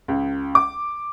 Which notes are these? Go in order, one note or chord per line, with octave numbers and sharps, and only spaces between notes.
C#2
D6